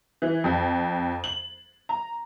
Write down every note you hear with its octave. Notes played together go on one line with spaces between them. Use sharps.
E3
F2
F#7
A#5